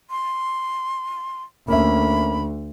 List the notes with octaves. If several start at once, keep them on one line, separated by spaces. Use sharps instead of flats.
C6
D2 A#3 C#4 E5 B5